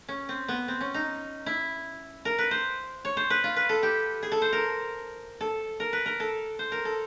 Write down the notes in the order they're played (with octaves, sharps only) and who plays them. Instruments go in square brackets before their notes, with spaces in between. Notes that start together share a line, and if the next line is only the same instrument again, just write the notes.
[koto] C#4
C4
B3
C4
C#4
D#4
E4
A#4
B4
C5
C#5
C5
B4
F4
B4
A4
G4
G#4
A4
C5
A#4
A4
A#4
B4
A#4
A4
C5
A#4
A4